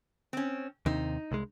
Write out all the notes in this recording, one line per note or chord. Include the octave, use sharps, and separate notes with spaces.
C4 C#4
D#2 C3 D#4
C2 G#3